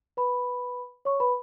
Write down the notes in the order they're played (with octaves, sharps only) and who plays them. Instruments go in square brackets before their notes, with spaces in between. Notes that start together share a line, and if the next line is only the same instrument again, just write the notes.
[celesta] B4 B5
C#5 C#6
B4 B5